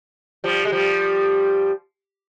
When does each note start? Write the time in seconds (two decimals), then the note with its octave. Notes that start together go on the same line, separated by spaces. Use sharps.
0.44 F3 G3
0.65 G#3
0.72 F3 G3